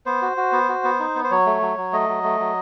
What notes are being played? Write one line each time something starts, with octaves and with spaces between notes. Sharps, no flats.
B3 C5
F#4
F#4
B3
F#4
B3
D#4
B3
C5
F#3 C#5
A3
F#3
F#3
A3 D#5
F#3
A3
F#3